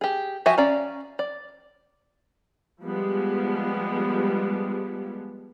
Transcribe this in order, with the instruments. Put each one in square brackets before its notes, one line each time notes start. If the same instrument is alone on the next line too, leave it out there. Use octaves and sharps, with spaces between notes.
[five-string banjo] G4 G#4
F3 F#4 G4 E5 G#5
C#4 D5 F5 A#5
D5
[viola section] F3 G3 G#3 B3